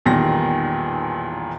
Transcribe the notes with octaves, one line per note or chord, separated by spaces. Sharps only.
B1 E2 A#2 D#3 G3 A#6